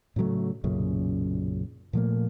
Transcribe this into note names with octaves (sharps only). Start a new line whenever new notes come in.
A2 C#3 F#3 A3
B1 F#2 A#2 C#3
A#2 F3 A3 A#3